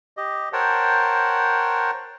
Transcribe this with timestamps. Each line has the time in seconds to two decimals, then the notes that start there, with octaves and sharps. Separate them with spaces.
0.17 G4 D#5
0.53 A#4 C5 C#5 F#5 G5 A5